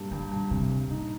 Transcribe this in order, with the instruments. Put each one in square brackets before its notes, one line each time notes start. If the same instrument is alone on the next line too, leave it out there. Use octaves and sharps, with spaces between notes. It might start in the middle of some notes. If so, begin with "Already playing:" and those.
Already playing: [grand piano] G2 G3 A#3
[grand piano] G2 [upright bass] D#3
[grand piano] G2
[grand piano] G2 [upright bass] C3
[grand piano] G2
[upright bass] A#2 [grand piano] D#4